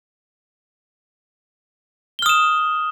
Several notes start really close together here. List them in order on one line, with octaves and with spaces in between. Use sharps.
G7 F6 D#6 E7